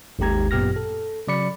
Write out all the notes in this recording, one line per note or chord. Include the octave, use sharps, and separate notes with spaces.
G#1 D#2 G#2 G4 A#5 G#6
F#2 A#2 B3 G4 F6 A#6
A4
C#3 F#3 D5 B5 C#7